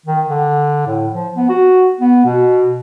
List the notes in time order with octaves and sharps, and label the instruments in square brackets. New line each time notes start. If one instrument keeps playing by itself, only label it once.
[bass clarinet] D#3
D3
A2
F3
B3
F#4
B3
B2